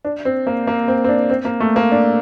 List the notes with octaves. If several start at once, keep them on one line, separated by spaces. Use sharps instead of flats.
D4
C4
A#3
A#3
C4
C4
D4
C4
A#3
A3
A#3
D4